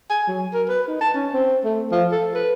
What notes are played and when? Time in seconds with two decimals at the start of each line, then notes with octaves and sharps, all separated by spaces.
0.10 G#5
0.27 F#3
0.53 A#4
0.69 B4
0.87 D#4
1.01 A5
1.14 C#4
1.33 C4
1.64 A3
1.91 F3
2.12 A4
2.35 B4